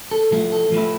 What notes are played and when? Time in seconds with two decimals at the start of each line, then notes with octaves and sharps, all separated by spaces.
0.11 A4
0.32 F3 A3 E4
0.52 A4
0.72 F3 A3 E4